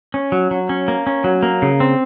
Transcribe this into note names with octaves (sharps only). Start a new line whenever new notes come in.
C#4
F#3
F#3
C#4
A#3
C#4
F#3
A#3
C#3
C4